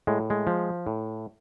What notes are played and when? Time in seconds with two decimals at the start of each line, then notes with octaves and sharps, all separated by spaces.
0.07 A2 G#3
0.30 G#3
0.47 F3
0.87 A2